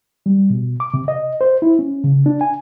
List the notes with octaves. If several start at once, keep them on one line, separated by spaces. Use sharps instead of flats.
G3
B2
D6
C3
D#5
C5
E4
C#4
C#3
D4
G#5